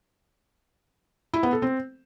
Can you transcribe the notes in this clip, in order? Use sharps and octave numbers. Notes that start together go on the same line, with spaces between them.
E4
B3
A4
C4